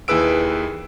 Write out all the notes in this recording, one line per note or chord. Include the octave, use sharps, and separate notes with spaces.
D#2 E3 G#4 B4 E6 D7